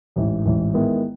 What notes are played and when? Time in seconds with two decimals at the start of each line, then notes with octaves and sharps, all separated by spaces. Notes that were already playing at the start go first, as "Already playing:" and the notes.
0.16 A1 G#2 E3
0.46 A1 G#2 E3
0.74 D#3 G#3 B3 E4